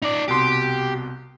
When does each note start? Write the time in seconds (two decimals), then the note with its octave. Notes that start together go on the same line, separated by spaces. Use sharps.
0.03 D#4 D5
0.28 C2 B2 G4 C6